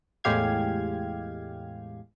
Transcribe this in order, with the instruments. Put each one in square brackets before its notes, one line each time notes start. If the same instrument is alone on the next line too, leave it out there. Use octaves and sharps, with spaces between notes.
[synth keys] E2 A2 G#3 G4 F5 G#6